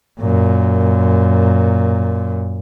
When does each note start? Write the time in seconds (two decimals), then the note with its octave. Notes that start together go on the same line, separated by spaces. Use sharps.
0.21 F#2 A#2